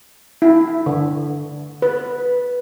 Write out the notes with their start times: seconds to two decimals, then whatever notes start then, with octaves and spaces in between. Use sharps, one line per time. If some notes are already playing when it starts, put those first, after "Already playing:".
0.42 E4
0.86 D3
1.82 B4